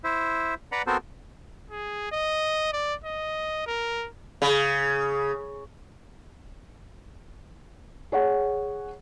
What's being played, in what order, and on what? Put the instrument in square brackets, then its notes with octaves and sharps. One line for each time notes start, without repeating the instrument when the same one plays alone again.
[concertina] E4 C5 E5
B4 D5 F#5 A#5 B5
B3 C4 F#4 A4 A#4 C5
[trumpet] G#4
D#5
D5
D#5
A#4
[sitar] C#3
[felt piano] G#4 C#5 F#5